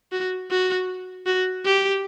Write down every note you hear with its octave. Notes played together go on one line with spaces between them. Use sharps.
F#4
F#4
F#4
G4